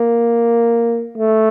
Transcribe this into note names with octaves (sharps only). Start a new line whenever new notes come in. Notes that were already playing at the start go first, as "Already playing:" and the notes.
Already playing: A#3
A3